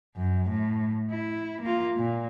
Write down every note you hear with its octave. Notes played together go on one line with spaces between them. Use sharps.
F#2
A2
E4
A#3 F4
A#2